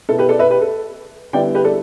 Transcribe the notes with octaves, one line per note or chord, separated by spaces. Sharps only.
B2 B3 E4 A4
G4 B4
A4 D5
B4 E5
G4 B4
A4
D3 G3 B3 E4 D5 G5
G4 B4
A4 D5